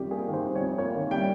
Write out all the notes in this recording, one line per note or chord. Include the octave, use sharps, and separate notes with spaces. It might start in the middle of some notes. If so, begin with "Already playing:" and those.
Already playing: F2 D#3 G3 G4
A#3 G#4
D#3
C5
G3
C#5
F2
A#3 C#5
D#3
G3 G5